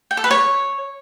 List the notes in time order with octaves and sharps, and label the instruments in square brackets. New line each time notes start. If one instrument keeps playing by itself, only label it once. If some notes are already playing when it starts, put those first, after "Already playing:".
[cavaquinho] G5
A4
B4
C#5